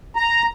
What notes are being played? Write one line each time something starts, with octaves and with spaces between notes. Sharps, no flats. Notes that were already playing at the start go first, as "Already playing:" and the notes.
A#5